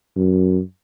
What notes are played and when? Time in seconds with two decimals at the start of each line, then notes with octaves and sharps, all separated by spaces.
0.16 F#2